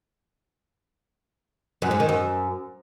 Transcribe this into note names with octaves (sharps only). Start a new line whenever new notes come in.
F#2
G#2
D#3
F#2